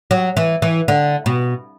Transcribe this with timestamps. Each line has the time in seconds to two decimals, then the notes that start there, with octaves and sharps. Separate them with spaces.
0.11 F#3
0.37 E3
0.62 E3
0.88 D3
1.26 B2